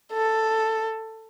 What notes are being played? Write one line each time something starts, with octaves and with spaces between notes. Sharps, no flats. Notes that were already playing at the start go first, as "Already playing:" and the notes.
A4